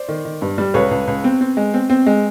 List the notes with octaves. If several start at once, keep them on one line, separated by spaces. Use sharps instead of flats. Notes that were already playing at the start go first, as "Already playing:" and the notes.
Already playing: C5 D5
D#3
D#3
G2
G3
C#2 B4 C#5
C#2
C#2
C4
C4
G#3
C4
C4
G#3